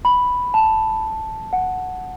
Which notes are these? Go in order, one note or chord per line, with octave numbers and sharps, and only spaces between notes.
B5
A5
F#5